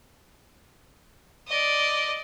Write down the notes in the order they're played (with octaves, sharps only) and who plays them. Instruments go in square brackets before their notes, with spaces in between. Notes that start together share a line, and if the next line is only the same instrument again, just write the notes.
[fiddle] D5 D#5